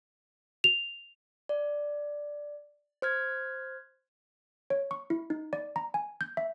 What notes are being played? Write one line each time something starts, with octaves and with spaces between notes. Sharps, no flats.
F7
D5
C5 F6 G#6
C#5
C#6
E4
D#4
D5
A#5
G#5
G6
E5